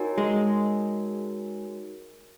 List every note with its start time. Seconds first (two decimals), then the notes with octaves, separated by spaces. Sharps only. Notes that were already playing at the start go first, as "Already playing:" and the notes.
Already playing: D#4 F#4 A#4 C#5 G#5
0.18 G#3